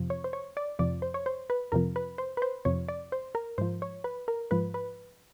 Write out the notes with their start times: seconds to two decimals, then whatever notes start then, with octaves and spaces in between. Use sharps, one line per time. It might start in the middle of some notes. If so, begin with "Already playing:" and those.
Already playing: F2 C3 F3
0.10 C#5
0.24 C5
0.33 C#5
0.57 D5
0.79 F2 C3 F3 D5
1.02 C5
1.14 C#5
1.26 C5
1.50 B4
1.72 F2 C3 F3 A#4
1.96 B4
2.18 C5
2.37 B4
2.42 C5
2.65 F2 C3 F3 C#5
2.88 D5
3.12 C5
3.35 A#4
3.58 G#2 F3 C5
3.82 C#5
4.04 B4
4.28 A#4
4.51 G#2 F3 B4
4.74 B4